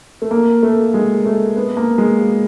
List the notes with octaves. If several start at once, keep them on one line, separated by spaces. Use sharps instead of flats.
A3
A#3
A3
G#3
A3
B3
A#3
G#3